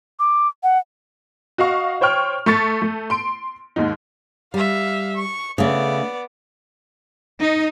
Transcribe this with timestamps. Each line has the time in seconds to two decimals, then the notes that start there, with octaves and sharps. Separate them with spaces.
0.19 D6
0.63 F#5
1.58 F#4 D#5 F5 C#6
2.01 C5 C#5 G5 C#6 F6
2.46 A3 C#6 A6 C#7
2.82 A3
3.10 C6 D7
3.76 D#2 G#2 D#3 D#4
4.54 G3 E5 F5
5.16 C#6
5.58 C#3 A3 B3 D5
7.41 D#4